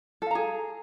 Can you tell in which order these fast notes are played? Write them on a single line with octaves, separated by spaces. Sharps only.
A4 F5 A#5 G#4